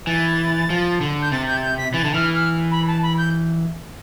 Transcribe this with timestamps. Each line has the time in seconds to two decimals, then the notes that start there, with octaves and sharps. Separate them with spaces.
0.07 E3 A6
0.70 F3
1.01 D3
1.22 G6
1.32 C3 A6
1.47 G6
1.57 A6
1.63 G6
1.78 B6
1.94 E3 A6
2.04 D3
2.14 E3 F6
2.35 F6
2.72 B5
2.87 A5
3.03 B5
3.18 G6